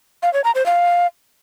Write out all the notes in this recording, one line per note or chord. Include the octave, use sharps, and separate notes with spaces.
F5
C#5
A#5
C5
F5